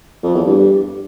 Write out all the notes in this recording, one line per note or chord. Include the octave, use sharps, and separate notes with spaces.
F2
E2
G2